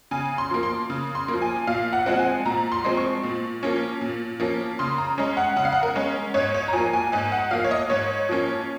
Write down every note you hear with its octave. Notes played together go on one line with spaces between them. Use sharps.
C#3 G#5
C6
F3 A#3
C6
C#3
C6
A#3
F3
G#5
A#2 F5
F#5
F3 G#3 C4 F#5
G#5
A#2 A#5
C6
F3 G#3 C4
C#6
A#2
F3 A#3 C#4
A#2
F3 A#3 C#4
C#3 C6
A#5
G#3 C#4
F#5
C#3 F#5
F5
F#5
A#4
G#3 C#4
G#2 C#5
C#5
A#5
F3 A#3 G#5
G#5
G#2 G#5
F#5
F3 A#3 F5
C#5
D#5
G#2 C#5
F3 A#3 C#4